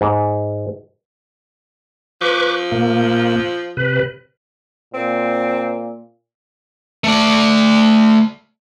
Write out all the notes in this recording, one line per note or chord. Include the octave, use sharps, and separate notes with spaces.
G#2
F3 B4 C#6 D6
A#2 A#3
C3 B4
A#2 C4
A3 D5